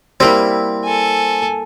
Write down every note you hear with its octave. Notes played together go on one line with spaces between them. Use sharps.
G3 A#3 C4 E4
A4 G#5